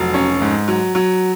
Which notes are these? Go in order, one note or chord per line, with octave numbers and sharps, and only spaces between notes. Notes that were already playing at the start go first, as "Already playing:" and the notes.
Already playing: F1 F#3
C#4
G#2
F#3
F#3